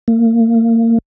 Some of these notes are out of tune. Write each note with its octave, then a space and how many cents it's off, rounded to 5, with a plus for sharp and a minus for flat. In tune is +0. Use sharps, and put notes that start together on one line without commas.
A#3 -30